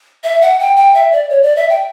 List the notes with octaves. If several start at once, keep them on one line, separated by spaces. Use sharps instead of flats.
E5
F#5
G5
G5
E5
D5
C#5
D5
E5
G5